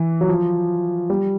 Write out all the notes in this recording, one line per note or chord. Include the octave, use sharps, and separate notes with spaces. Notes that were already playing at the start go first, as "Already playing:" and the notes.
Already playing: E3
F#3
F3
G3